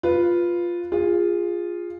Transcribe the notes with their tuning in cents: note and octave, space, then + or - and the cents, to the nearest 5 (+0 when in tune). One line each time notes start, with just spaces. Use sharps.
F4 +0 B4 +0
F4 +0 G#4 -25